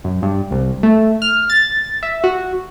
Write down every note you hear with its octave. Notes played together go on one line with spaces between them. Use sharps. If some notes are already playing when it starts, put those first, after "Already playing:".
F#2
G2
C2
A3
F6
A6
E5
F#4